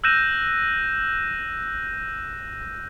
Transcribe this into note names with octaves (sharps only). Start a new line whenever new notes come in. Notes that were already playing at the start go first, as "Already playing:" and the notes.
E6 F#6 G6 A#6 D#7 E7